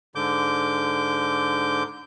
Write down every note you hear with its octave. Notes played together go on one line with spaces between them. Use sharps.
G#2 D3 D6 G6